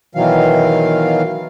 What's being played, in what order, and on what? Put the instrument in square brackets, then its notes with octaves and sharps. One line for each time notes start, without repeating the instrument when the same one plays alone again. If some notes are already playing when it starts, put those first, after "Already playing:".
[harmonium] B2 D#3 E3 F#3 F5